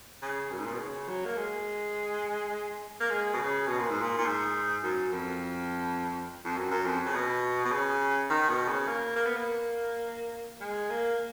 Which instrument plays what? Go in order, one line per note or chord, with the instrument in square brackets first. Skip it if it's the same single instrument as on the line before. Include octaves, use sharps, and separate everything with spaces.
[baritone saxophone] C#3
F#2
G#2
A#2
B2
C#3
F#3
A#3
G#3
A#3
G#3
B2
C#3
B2
A#2
G#2
A#2
A#2
G#2
F#2
F2
F2
F#2
F#2
F2
C#3
B2
B2
C#3
D#3
B2
C#3
A#3
A#3
B3
A#3
G#3
A#3